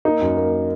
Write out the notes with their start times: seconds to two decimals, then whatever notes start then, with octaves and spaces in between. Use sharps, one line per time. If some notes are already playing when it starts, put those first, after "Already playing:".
0.05 A#3 D#4
0.22 F#2
0.37 A#3